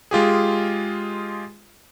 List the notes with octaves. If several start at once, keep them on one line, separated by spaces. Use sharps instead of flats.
G#3 F4 G4 G#4